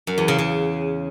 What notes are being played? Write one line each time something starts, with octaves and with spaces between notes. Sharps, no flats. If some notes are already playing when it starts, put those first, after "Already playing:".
F#2
E2
C#3
C#3